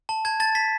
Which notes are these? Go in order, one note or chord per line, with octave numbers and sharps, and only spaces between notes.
A5
A5 G#6
A5 A6
A5 B6